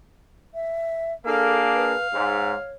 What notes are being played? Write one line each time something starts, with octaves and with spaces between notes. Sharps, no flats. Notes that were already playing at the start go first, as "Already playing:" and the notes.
E5
A#3 D4 G#4 A4 F5
B4
G#2 C#5